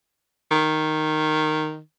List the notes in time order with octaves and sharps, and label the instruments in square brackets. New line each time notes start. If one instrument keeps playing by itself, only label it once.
[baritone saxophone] D#3